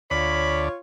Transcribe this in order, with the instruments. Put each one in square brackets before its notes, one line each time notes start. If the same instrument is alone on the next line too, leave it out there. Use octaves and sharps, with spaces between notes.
[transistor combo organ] D2 D5 [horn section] F4 C#5 [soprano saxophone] B5